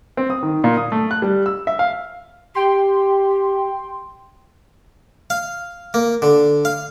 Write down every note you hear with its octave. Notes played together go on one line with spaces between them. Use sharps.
C4
D#6
D#3
A#2
D#6
A3
F#6
G3
E6
E5
F5
G4 G5 C6
F5
A#3
D3
F5